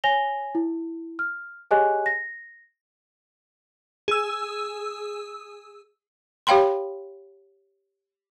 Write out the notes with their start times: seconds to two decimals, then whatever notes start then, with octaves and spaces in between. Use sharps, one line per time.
0.04 C#5 G#5 A#6 F7 G7
0.55 E4
1.19 F6
1.71 G4 G#4 C#5 D#5 G#5 F#6
2.06 A#6
4.08 G#4 E6
6.47 G4 C#5 F5 G5 B5 C6